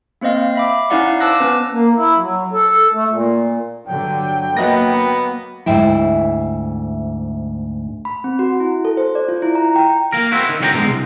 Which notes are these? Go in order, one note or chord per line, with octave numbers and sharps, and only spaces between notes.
A#3 C4 C5 D#5 F5
E5 B5 D6
C#4 D#4 E4 D5 F5 F#5
C5 A5 D6 E6 F#6 A#6
B3 C#4 B4
A#3
E4
F#3
A4
A3
A#2
G2 D3 F#3 G5
F#3 A#3 B3 D#5 A#6
D2 G#2 E4 G5
B5
C4
F#4
E4
A4
C5
D5
F4
E4
A#5
G5
A#3 A#4
C4 E4 F#4
D#3
C2 D3 F#3 F#5 G5 A#5
B2 D3 E3 G#3
C2